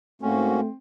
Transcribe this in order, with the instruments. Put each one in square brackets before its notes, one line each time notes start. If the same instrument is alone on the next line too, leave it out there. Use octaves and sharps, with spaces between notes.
[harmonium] G#2 A#3 F#4 [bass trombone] A3 [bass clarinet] C4 [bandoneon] C#4